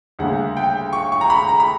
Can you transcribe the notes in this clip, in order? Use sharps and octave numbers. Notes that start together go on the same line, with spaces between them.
D2 C#3 G3 A#3 F#5
G5
C#6
C#6
A#5
B5
A#5
B5